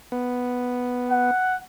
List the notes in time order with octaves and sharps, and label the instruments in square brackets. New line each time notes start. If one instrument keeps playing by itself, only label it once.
[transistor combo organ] B3
[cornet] F#5